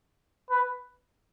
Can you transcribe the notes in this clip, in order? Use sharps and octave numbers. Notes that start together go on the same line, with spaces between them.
B4